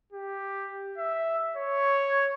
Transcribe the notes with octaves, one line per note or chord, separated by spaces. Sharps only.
G4
E5
C#5